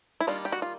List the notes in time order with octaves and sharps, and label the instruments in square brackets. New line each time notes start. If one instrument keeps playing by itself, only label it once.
[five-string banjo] E4
D#3 G3 A#3 D4 F4
G4
F#4
F4